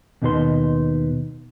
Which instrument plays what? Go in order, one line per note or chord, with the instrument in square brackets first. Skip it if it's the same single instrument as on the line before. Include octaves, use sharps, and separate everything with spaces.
[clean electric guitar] D#2 B2 D#4 G#4 B4 C6